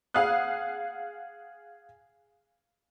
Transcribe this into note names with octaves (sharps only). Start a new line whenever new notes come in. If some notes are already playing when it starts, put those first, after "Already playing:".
G#4 F5 F#5 D#6 F#6